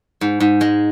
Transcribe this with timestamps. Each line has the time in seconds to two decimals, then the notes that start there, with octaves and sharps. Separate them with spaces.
0.21 G#2
0.40 G#2
0.61 G#3